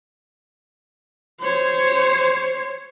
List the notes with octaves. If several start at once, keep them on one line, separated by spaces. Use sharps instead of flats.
C5 C#5